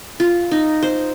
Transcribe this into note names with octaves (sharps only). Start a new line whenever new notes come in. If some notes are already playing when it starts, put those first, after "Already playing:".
F4
D#4
C5